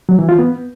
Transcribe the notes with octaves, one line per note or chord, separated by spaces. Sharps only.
F#3
E3
F4
B3